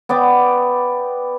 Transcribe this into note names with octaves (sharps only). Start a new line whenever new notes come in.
B3 D5 G5